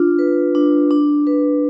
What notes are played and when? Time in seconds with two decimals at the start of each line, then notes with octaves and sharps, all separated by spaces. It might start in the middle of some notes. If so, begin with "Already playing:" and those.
Already playing: D4 F4
0.19 B4
0.55 D4
0.91 D4
1.27 B4